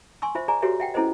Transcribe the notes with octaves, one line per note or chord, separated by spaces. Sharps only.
G#5 C6 C#6 E6
F4 C5 E5
G#4 D5 G#5 A#5
F#4 G4 A4 B4 C#5 E5
E5 F#5 G5
C#4 E4 A4 B4 C5 D#5